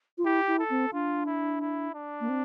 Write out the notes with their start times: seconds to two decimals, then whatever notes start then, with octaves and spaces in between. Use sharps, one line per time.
0.18 F4
0.24 E4 G4
0.47 E4
0.59 A4
0.70 C4
0.93 D4 F4
1.26 E4
1.61 E4
1.94 D4
2.20 A#3
2.29 C4